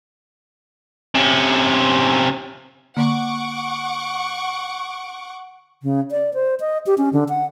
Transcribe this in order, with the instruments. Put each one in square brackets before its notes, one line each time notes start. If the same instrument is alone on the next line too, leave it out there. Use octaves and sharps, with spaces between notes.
[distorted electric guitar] C3 C#4
[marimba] D3 A#3 [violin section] F#5 C#6 D6
[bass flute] C#3
D5
C5
D#5
G4
C#4
D3
F#5